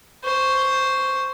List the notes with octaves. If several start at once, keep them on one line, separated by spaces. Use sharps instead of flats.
C5 C#6